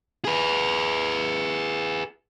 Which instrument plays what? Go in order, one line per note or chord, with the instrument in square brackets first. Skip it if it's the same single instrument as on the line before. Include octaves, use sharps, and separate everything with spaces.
[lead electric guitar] G#4 B4